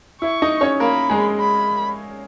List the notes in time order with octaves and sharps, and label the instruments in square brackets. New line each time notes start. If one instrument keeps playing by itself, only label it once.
[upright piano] E4 [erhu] C#6
[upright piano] D#4 D#5
C#4 C#5
[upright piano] A#3 A#4 [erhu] B5
[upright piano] G#3 G#4
[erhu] B5